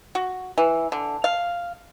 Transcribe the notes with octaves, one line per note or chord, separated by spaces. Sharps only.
F#4
E3
D3
F5